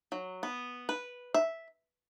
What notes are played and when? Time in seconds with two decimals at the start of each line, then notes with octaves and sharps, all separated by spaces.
0.12 F#3
0.43 B3
0.89 B4
1.34 E5